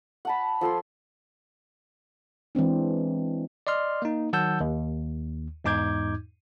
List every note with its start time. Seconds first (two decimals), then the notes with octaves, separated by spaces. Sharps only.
0.25 F#5 A5 B5
0.61 F3 A4 G#5 C6
2.55 E3 G#3 C4 D4
3.67 D5 D#5 C6 F6
4.02 A#3 D#4
4.33 D#3 F#3 F#5 A5 E6 G6
4.60 D#2
5.64 E2 G#2 D#4 D6 G6 G#6